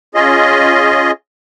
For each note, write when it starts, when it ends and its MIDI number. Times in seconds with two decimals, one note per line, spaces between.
0.15 1.11 61
0.15 1.11 65
0.15 1.11 68
0.15 1.11 75